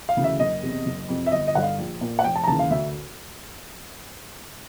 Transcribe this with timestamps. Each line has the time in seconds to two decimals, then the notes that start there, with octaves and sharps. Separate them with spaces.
0.09 F5
0.17 D2 C#3 E3
0.24 E5
0.40 F#1 D#5
0.63 E2 C3
0.86 F#1
1.09 F2 C3
1.26 E5
1.32 G1 D#5
1.47 D#5
1.55 G2 D3 F#5
1.63 F5
1.78 A#1
2.01 A#2
2.19 F#5
2.24 F1 G5
2.36 A5
2.44 A#5
2.47 D#2 C#3 E3 A5
2.59 F5
2.70 D2 E5